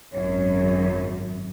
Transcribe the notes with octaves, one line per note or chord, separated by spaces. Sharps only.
G#1 F#2 C#5